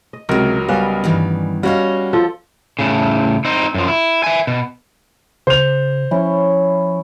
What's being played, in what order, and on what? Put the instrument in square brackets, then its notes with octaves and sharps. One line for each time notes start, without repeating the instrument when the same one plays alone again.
[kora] D#5
[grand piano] C#2 F#3 A#4 [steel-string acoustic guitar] C3 G#3
[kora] G3 B3 C#4 [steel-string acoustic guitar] F5
[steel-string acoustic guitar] G2 D#3 E3
[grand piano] G3 C#4 F5 [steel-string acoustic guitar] F#4 C#5 D#5
[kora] F3 [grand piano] A4
[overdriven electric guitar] A2 C#3
C4 D#4
F#2 F3
E4
E5 G#5
B2
[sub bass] C#3 [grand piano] C5 F7
[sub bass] F3 [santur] C#4 E4